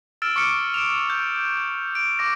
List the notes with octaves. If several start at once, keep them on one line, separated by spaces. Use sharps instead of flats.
E6 F6 A6 D7 E7
C#6 D6 F6 C#7 D7
D7 E7 F7
G6
D7
D6 A#6